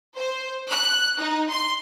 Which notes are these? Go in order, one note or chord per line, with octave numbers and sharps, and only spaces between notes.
C5
F#6
D#4
C6